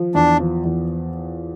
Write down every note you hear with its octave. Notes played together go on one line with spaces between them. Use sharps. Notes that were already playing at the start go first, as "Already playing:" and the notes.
Already playing: F3
E2 D4
F3
E2